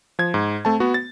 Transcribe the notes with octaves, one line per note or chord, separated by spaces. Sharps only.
F3 G#6
G#2
A3 C4 A5
B3 F#4
A6